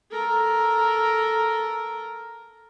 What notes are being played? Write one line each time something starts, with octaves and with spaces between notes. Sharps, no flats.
A4 A#4